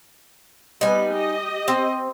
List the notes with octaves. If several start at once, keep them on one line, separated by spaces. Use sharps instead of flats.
G3 B3 D#4 B4 G#5
G4 D#5
C4